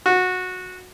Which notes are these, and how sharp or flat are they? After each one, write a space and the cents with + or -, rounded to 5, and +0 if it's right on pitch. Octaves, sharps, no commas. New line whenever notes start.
F#4 -15